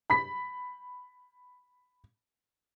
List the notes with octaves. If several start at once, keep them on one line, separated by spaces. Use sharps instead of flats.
B5 B6